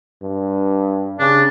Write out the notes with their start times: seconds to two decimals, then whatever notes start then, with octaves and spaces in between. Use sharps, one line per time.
0.22 G2
1.19 C#3 D4